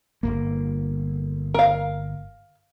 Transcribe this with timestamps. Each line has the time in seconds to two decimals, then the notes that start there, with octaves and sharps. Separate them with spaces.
0.23 G1 F#2 A#3
1.54 A#4 F5